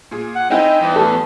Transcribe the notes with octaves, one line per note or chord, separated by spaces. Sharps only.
A#2 G#4
F#5
C4 D#4 E4 G5 G#5
E2
A2 A4